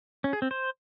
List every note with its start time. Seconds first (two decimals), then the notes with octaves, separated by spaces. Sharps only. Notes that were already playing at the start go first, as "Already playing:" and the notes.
0.24 C#4
0.33 G#4
0.42 C4
0.51 C5